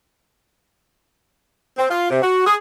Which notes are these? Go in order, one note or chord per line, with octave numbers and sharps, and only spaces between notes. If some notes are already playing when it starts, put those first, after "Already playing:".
C4
F4
C3
F#4
G#4